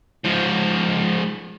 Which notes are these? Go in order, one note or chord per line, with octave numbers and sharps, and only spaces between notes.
G#2 F3